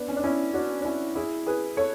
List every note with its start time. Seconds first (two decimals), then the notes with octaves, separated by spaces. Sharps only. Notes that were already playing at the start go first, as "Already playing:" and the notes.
Already playing: B3 D4
0.08 C#4
0.16 D4
0.24 C#4 E4
0.54 D4 F#4
0.81 D4
0.85 C#4 E4
1.15 E4 G#4
1.47 G#4 B4
1.77 A4 C#5